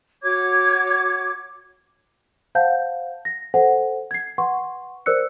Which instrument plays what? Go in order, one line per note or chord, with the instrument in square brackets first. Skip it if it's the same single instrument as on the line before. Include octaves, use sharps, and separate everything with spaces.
[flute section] F#4 C#5 D6 G#6
[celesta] C5 F5 F#5 A5 G6
A#6
A4 C5 F#5 G#5
G#6 C7
B4 F#5 C6 C#6
A#4 C5 D5 E6 F#6 C#7